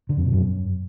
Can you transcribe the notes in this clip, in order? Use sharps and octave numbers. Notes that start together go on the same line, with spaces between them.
D3
F2
B2
F#2